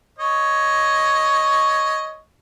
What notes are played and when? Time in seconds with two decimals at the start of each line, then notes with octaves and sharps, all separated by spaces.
0.19 C#5 D#5